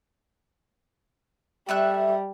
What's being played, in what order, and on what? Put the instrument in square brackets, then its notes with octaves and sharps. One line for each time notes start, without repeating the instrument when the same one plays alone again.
[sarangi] G3 [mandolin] A3 E5 F#6